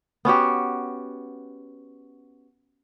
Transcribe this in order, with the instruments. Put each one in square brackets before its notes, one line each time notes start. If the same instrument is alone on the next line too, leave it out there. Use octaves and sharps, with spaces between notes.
[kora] B3 C#4 F#4 G4